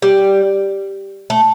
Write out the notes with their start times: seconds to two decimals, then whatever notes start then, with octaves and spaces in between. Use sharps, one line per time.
0.02 G3
1.30 A3